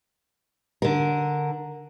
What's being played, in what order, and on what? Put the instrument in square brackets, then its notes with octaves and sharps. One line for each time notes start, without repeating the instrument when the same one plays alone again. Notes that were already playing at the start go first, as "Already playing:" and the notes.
[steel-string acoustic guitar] D3 A#4